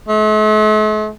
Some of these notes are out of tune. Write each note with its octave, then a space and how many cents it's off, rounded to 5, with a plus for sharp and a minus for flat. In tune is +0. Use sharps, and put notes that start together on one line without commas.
A3 -45